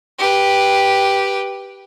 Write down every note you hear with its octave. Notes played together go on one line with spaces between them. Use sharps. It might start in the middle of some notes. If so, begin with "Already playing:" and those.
G4 B4